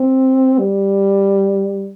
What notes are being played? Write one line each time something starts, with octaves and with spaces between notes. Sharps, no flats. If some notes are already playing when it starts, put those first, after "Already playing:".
Already playing: C4
G3